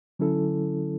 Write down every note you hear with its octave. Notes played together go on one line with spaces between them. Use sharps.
D3 F#3 C#4 E4 A4